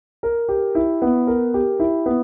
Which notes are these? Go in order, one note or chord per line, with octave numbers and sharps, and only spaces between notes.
A#4
G4
E4
B3
A#4
G4
E4
B3